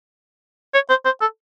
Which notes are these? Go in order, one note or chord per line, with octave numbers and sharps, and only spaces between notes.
C#5
C5
C5
A4